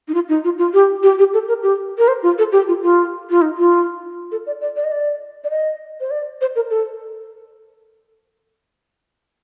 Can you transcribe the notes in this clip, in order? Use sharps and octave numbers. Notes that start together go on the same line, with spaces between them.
D#4
F4
D#4
F4
F4
G4
G4
G4
A4
A#4
G4
A#4
C5
F4
A4
G4
F4
F4
F4
D#4
F4
A4
D5
D5
D5
D#5
D5
D5
D#5
C5
D5
C5
A#4
A4